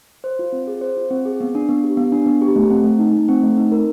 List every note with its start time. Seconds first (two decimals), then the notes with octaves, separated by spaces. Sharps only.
0.24 C5
0.39 F4
0.52 C4
0.67 G#4
0.81 C5
0.97 F4
1.11 C4
1.26 G#4
1.41 B3
1.55 D4
1.69 B3
1.84 G4
1.97 B3
2.12 D4
2.26 B3
2.42 G4
2.56 A3
2.70 C4
2.84 A3
2.99 D#4
3.13 A3
3.28 C4
3.43 A3
3.58 D#4
3.72 A#4